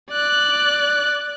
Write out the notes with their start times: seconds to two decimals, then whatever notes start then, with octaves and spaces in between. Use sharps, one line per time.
0.11 D5 F#6